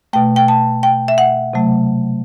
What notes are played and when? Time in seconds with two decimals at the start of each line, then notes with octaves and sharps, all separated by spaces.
0.13 B2 A3 G5
0.36 G5
0.48 A5
0.83 G5
1.08 E5
1.18 F#5
1.53 C3 F#3 A3